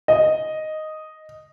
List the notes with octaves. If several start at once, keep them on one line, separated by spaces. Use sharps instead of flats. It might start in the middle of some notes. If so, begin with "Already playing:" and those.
D#5